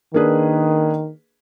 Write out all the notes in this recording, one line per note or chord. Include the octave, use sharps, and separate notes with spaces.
D#3 A#3 D4 G#4 B4